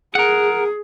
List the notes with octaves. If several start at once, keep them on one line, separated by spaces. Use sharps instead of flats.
G#4 A#4 F#5